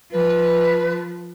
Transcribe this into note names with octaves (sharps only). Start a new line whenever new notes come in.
F3 B4